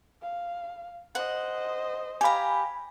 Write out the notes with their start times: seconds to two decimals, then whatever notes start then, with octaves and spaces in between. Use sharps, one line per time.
0.22 F5
1.15 C5 D#5 F#5
2.21 G4 F5 G#5 A#5 B5